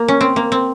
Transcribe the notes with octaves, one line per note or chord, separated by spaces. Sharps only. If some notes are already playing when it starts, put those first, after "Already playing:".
Already playing: A#3
C#4
C4
A#3
C4